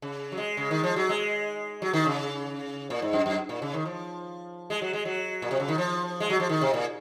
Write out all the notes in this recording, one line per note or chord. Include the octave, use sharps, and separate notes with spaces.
C#3
F#3
G#3
C#3
D#3
F3
F#3
G#3
F#3
D#3
C#3
A#2
G#2
F#2
F#2
A#2
C#3
D#3
F3
G#3
F#3
G#3
F#3
A#2
C3
C#3
D#3
F3
G#3
F#3
F3
D#3
C3
A#2